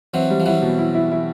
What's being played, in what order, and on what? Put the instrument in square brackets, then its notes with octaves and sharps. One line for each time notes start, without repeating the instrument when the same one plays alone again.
[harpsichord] E3 F#3 [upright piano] C4
[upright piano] G3
[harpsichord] F3
[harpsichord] E3 F#3 [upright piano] E4
[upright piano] B2
E4
E4
E4